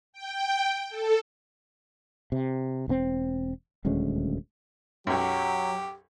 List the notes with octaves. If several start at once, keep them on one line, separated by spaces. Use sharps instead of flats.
G5
A4
C3
E1 G#2 C4
D#1 D2 G#3 C#4
B1 F#2 F#3 G4